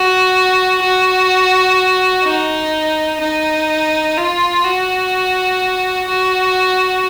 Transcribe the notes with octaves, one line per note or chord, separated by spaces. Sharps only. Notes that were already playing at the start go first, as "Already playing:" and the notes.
Already playing: F#4
F#4
D#4
D#4
F4
F#4
F#4